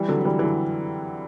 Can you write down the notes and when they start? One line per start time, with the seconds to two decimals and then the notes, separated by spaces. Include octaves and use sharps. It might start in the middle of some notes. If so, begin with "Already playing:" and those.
Already playing: E3 G3
0.08 D3 F#3
0.20 F#3
0.25 E3 G3
0.39 E3
0.43 D3 F#3